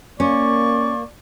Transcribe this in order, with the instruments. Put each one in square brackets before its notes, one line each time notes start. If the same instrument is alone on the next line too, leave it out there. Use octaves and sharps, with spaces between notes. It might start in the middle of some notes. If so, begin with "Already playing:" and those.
[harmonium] A#3 [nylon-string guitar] C#4 [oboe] D5 [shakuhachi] C#6